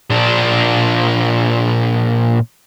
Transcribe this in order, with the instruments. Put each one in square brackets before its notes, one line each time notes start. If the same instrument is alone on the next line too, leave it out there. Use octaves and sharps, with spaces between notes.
[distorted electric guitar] A#2 D4